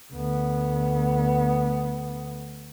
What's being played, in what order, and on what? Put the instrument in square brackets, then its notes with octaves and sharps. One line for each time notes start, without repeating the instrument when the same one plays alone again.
[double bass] D2 B3